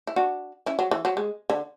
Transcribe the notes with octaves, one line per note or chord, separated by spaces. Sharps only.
E4
D4 F#4
C#4 E4
F#3
E3
F#3
G#3
D3